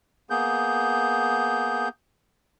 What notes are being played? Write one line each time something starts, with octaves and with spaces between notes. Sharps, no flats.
A#3 B3 G#4 G6